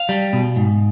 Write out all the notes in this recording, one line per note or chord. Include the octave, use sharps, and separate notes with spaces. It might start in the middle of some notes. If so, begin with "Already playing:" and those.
Already playing: F5
G3
B2
G#2